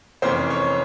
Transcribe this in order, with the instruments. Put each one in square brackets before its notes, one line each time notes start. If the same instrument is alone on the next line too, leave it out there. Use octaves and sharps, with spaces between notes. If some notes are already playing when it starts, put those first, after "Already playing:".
[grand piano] F1 F2 E3 A#3 C#4 C5
C#5